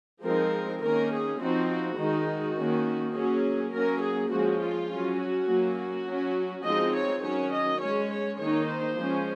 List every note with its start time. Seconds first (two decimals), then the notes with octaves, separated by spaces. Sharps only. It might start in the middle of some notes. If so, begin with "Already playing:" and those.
0.24 F3 G#3 C4 D#4 A#4
0.82 D#3 A#3 C#4 A#4
1.11 G#4
1.40 F3 C4 D#4 F#4
1.70 F#4
1.98 D#3 G#3 D#4
2.28 F#4
2.56 D#3 A#3 C#4
3.14 F#3 A#3 C#4 G#4
3.73 F#3 A#3 C#4 A#4
4.02 G#4
4.31 F3 G#3 C#4 F#4
4.60 F4
4.88 F#3 C#4
5.18 F#4
5.47 F#3 A#3 C#4
5.77 F#4
6.05 F#3 C#4
6.63 F3 G#3 C4 D#4 D#5
6.92 C#5
7.21 D#3 F#3 C#4 C#5
7.51 D#5
7.80 G#3 C#4 C#5
8.09 C#5
8.38 D#3 A#3 D#4 C#5
8.67 C5
8.97 F3 G#3 C#4